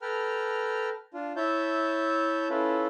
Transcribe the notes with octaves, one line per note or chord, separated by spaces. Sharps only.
A4 B4 G5 A#5 F6
D4 F4
E4 C#5 E5 A5 G6
C#4 E4 F4 A4 B4